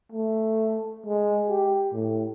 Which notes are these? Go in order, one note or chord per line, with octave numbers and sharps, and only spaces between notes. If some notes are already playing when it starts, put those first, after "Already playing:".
A3
G#3
G4
A2